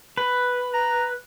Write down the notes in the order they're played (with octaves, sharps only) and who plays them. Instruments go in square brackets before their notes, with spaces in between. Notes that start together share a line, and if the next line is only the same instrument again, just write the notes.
[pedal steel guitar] B4
[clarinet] A#5